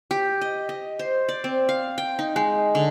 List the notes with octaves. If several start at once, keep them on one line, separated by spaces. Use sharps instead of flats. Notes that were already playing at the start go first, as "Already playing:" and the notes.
G4
D#5
D#5
C5
D5
C4
F5
G5
D#4
G#3
D3